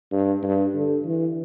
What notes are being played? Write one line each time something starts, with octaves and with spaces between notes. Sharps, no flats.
G2
G2
D3
E3